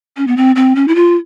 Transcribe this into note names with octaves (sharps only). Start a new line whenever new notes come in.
C#4
B3
C4
C4
C#4
E4
F4